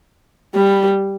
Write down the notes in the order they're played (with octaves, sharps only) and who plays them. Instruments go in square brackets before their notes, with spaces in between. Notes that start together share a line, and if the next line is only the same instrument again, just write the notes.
[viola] G3